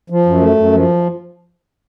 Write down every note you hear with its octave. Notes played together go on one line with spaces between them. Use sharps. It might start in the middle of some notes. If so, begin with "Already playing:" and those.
F3
F#2
A3
F#2
F3